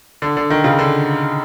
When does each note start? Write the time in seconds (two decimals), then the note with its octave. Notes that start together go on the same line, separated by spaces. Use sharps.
0.22 D3
0.37 D3
0.50 D#3
0.64 C#3
0.79 D3